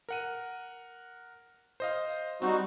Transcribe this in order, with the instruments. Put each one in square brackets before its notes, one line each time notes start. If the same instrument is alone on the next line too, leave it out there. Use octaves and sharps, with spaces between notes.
[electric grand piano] A#4 F#5 D#7
C5 D#5 F5
[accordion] G3 D#4 F#4 [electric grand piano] C4